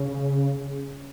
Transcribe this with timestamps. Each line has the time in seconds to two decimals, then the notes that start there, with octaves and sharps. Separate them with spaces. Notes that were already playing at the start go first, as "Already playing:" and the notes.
Already playing: C#3